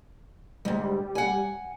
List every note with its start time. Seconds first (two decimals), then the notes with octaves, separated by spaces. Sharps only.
0.65 D2 G#2 G3
1.15 F#5 G#5